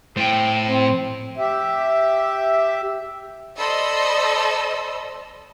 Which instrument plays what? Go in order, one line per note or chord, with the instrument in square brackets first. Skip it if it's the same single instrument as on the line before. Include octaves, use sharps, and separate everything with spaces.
[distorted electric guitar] A2 [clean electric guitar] C5 G5
[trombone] C4
[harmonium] G4 E5
[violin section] A4 C5 D5 D#5 B5 E6